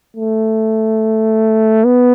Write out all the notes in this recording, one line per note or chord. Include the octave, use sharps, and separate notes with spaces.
A3
B3